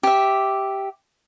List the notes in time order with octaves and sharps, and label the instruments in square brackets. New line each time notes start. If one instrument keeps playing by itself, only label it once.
[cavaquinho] G4 E5